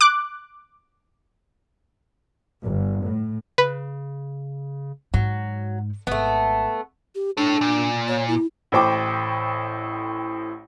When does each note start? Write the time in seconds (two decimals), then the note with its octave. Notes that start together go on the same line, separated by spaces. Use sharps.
0.01 D6 F#6
2.62 G1
3.05 A2
3.58 C#3 B4
5.14 G#2 F#3
6.07 G#1 A3 B3
7.15 G4
7.37 D4 A4 C#5
7.61 A#2
8.08 C#5
8.28 E4
8.72 A1 A2 C5 G5 D6